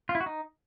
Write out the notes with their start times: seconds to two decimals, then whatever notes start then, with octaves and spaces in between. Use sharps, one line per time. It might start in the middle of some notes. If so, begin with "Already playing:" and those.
0.09 F4
0.15 E4
0.21 F#4
0.26 D#4